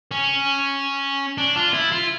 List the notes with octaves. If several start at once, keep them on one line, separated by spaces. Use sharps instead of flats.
C#4
D4
F4
E4
F4